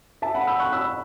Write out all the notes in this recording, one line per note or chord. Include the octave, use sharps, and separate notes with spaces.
E5 A5
F#5 B5
B5 E6
C#6 F#6
B5 E6